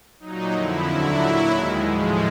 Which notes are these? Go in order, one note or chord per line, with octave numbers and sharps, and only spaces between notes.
A#2 F#3 D#4
F2 D3 F3 E4
D#2 D3 F#3 E4
A#2 F#3
D#2 D#3 G#3
A2 F3 G#3